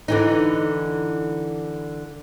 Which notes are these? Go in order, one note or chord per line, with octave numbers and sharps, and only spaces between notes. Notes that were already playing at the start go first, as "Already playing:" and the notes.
D3 E3 D#4